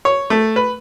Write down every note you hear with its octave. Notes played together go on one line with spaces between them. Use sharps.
C#5
A3
B4